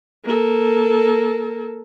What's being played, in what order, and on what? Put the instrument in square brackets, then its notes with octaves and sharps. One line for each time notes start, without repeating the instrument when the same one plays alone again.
[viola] A#3 A4